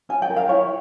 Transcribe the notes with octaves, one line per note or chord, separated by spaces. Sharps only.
C#4 G#5
G5
A#4
F5
E4 C#5